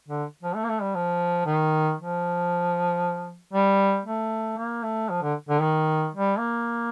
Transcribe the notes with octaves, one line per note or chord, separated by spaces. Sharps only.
D3
F3
A3
A#3
A3
G3
F3
D#3
F3
G3
A3
A#3
A3
F3
D3
D3
D#3
G3
A#3